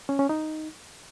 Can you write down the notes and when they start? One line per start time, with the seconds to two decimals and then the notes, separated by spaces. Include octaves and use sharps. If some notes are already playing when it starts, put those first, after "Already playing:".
0.09 C#4
0.19 C#4
0.29 D#4